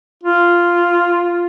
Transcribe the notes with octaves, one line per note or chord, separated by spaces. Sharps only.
F4